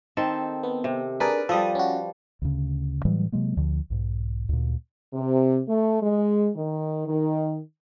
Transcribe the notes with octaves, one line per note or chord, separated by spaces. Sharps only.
D#3 C4 A4
B3
C3
D4 G#4 A#4 B4 D5
F3 G3 A4 D#6
C#4 F#4
D2 C#3
A2 E3 F#3 G3
C3 F#3 G#3 A#3
D2 D3 F3
B1 G#2
D2 A#2
C3
A3
G#3
D#3
D#3